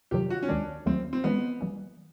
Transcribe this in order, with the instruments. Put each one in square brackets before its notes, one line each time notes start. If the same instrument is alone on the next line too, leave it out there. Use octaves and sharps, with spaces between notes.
[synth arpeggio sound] F2 C3 D#3 F#3 [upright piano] G4
[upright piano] F#4
C#4
[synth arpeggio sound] D#2 D#3 G#3 [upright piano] D4
[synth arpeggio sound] D#2 D#3 F#3 A3 [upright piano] C4
[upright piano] C4
[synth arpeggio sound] E3 G#3 C#4 [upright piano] B3
[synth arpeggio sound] E3 G3 A#3 C#4